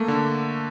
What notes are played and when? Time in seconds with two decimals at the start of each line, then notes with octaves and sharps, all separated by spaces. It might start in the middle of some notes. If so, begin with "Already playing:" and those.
Already playing: A3 A#3
0.08 D3